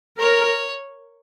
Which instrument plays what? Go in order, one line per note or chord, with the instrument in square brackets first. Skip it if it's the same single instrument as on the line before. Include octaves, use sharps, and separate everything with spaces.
[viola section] A#4 [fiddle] C#5